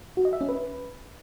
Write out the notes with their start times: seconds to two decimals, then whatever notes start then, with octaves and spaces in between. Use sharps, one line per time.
0.17 F#4
0.25 D#5
0.33 E5
0.41 C#4
0.49 B4